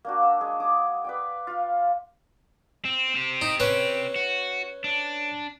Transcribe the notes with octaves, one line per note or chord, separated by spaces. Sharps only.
A#3 D4 F#4
E6
G#3 G#4
D6 D#6
B4 D5 G5
F4 F5
C4
C4 G4
D#4
C#4 B4
F#4
D4